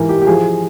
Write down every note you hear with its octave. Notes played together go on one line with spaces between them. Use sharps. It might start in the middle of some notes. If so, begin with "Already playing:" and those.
Already playing: G#2 E3 A#4
G4
G4
F3 G#4